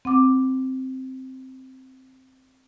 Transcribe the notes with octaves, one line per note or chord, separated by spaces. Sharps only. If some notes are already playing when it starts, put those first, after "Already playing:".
C4 F#5 D6